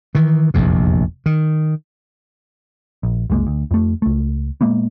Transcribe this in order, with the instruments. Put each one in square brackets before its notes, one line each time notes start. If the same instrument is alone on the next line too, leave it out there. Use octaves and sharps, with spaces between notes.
[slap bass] D#3 E3
F1 A#1 E2 C3
D#3
[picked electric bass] A#1
F#1 C2 G#3 A#3
D2
F2 A3
C#2 A3
A#2 G#3 A#3 B3